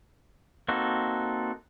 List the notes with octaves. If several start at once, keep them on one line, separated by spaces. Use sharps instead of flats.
A#3 C4 D#4 F#4 A4